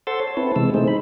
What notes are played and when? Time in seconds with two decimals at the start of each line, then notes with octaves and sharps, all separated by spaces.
0.07 A4 C5 F#5 C6 E6 A6
0.20 C#5
0.37 C4 E4 B4 A5
0.56 C3 E3 G#3 E6
0.74 A3 D#4 G#4 C5
0.88 B5